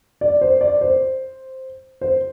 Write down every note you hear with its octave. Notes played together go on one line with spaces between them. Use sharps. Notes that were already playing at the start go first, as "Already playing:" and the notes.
D5
C5
D5
C5
C5